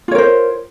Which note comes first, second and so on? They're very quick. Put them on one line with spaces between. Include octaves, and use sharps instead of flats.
F4 C#5 A#4 C5